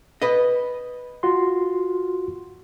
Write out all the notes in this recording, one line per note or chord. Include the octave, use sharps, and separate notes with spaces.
B4 D#5
F4 F#4 C6